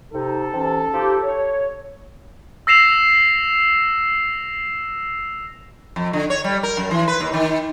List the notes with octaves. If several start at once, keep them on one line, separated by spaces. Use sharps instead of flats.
C3 D#4 A4
C3 E3 C#4
F3 D#4 G4
C#5
E6 A#6 C7 E7 F7
F2
D3
C#5
G3
A#4
F#2
E3
B4
D#2
D#3